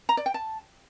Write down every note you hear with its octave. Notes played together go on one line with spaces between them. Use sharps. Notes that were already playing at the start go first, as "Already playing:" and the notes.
A#5
D5
G5
A5